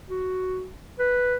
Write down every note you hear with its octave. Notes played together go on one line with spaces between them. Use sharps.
F#4
B4